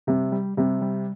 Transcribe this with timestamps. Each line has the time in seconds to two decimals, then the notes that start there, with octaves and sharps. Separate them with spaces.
0.07 C3 G3
0.32 G3
0.57 C3 G3
0.82 G3